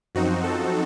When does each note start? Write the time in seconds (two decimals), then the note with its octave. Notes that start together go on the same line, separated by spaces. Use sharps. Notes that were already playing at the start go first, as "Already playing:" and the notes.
0.15 F#2 F3 C4 D#4 F#4
0.44 A4